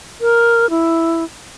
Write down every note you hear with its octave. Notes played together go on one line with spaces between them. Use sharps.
A#4
E4